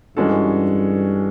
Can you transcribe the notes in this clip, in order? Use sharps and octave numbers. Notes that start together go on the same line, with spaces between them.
G2 E3 G#3 C#4 F#4 A4